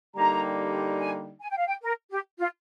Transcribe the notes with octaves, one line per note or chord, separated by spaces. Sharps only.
D3 G3 A#3 D#4 G4 A#5
G#5
G#5
G5
F5
G5
A#4
G4
F4